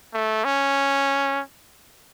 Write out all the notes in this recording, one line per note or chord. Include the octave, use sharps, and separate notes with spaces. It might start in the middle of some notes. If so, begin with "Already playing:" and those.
A3
C#4